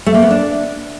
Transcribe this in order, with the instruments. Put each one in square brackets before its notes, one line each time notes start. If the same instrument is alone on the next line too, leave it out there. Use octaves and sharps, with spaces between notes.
[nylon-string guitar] A3
A#3
B3
D4